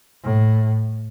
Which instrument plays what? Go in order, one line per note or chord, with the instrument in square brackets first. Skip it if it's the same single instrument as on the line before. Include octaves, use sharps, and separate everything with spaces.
[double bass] A2